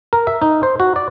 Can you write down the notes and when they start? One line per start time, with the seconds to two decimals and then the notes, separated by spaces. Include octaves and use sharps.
0.13 A#4
0.27 E5
0.42 D#4
0.63 C5
0.80 F#4
0.96 D5